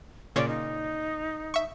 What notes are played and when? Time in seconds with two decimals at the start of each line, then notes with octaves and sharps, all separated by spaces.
0.36 A#2 C#3 C#5 D5
0.49 D#4
1.54 E5 C#6